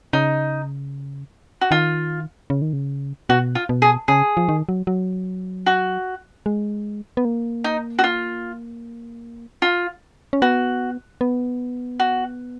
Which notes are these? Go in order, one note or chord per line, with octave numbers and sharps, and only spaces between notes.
C#3 D#4
F#4
D#3 F4
C#3
D#3
C#3
B2 F#4
F4
B2
G#4
C#3 G#4
F3
D#3
F#3
F#3
F#4
G#3
B3
A#3
D#4
F#4
F4
F4
C#4
B3 F#4
B3
F#4